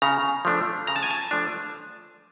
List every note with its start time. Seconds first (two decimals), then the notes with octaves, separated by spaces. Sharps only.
0.02 C#3 A#5
0.45 F3 A3 D4
0.87 C#3 A#5
0.96 A5
1.03 G#5
1.11 A5
1.31 F3 A3 D4